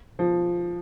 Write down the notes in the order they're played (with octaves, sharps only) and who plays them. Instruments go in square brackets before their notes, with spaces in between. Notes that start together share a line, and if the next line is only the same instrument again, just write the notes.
[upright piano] F3